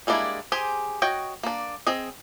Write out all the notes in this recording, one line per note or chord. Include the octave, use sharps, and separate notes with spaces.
G3 G#3 A#3 D4 E4
G4 G#4 C5 G#5
F#4 C#5 D#5 G5
A#3 D4
C4 G#4 D#5